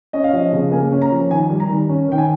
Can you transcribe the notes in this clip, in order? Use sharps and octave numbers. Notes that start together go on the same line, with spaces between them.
C#4 D#5
F5
F3 D#5
C#3
A#3 G#5
C#4
A#5
F3
D#3 G#5
G3
A#5
D#3
C#4
D#3 G5
G#5